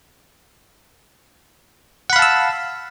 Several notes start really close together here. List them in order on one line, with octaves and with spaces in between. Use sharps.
F#5 B5 F5 A5 E6